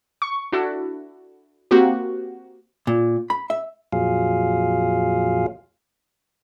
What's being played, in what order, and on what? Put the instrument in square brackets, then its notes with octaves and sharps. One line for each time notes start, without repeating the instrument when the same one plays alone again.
[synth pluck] C#6
D4 E4 F#4 A4
A#3 C4 F#4 G4
[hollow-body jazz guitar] A#2
B5
E5
[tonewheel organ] F2 A#2 F#3 F4 G#4 F5